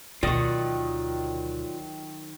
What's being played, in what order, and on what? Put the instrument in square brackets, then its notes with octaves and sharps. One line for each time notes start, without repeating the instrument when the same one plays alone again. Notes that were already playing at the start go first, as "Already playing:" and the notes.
[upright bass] D2 B2 [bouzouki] D#3 F#3 [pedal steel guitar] F4 D5 D#6